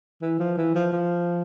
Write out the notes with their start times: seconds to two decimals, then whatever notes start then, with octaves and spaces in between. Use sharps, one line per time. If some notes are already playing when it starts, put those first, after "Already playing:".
0.22 E3
0.39 F3
0.57 E3
0.75 F3
0.93 F3